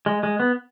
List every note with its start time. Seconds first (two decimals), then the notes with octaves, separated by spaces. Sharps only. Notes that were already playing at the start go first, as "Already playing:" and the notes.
0.06 G#3
0.23 G#3
0.40 B3